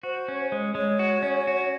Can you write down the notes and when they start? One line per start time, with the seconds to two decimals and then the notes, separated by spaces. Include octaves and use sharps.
0.03 F#4 C5
0.28 C#4
0.52 G#3
0.75 G#3 C#5
0.99 F#4
1.23 C#4
1.47 F#4